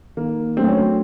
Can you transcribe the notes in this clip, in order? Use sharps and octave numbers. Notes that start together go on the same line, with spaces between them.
D#3 A#3
F#3 A3 C4 D4
C#4
C4